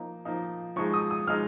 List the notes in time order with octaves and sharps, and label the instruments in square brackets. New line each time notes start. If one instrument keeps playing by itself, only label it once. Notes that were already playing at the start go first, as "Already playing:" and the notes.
Already playing: [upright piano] F3 A#3 D#4
F3 A#3 D#4
F3 G#3 D#4 C#6
D#6
D#6
F3 G#3 D#4 F6